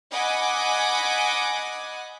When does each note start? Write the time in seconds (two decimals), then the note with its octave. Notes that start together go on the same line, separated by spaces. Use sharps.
0.11 D#5 F#5 G#5 B5 D6 D#6